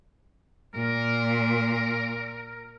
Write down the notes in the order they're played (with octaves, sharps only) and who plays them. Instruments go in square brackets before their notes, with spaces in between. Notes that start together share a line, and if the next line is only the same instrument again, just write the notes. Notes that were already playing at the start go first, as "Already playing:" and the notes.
[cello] A#2 [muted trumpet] A#4